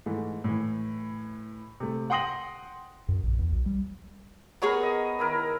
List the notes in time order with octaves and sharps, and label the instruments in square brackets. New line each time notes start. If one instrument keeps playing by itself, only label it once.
[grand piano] G#2 E3 A3
A2 E3
C3 A3
F#5 G5 C6 D#6 A#6 F#7
[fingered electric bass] F#2
A#1
E2
B1
G3
[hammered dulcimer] B3 A#4 [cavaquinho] G#4 C#5 A#5
[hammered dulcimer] D#5
D#3 E4 A#4